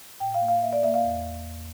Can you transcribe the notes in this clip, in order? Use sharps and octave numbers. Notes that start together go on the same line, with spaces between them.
A2 G5
F5
A#3
F5
A#3 E5
D5
A#3 E5
F5
E2
E2
E2